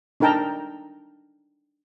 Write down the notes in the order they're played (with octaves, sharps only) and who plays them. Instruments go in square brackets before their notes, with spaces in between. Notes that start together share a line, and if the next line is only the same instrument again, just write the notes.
[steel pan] D4 D#4 A#4 G5 A5 A#5